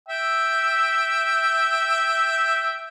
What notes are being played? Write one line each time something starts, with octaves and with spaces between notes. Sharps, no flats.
E5 G5 E6